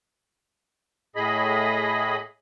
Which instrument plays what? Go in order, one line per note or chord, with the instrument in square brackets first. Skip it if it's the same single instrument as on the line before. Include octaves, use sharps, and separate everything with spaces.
[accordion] A2 G#4 D#5 B5